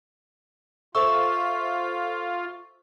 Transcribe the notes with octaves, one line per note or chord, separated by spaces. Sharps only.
F4 A4 C5 E5 C#6 E6